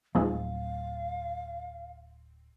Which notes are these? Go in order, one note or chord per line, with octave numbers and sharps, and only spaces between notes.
D1 F3 G#3 C4 D#4 F5